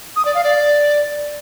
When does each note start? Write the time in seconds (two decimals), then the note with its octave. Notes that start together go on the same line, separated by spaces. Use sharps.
0.16 D#6
0.25 D5
0.34 F5
0.44 D5